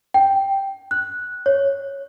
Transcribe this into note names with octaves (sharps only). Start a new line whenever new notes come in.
G5
F#6
C#5